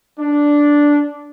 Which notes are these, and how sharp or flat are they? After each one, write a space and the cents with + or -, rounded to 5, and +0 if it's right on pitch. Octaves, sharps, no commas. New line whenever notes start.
D4 -5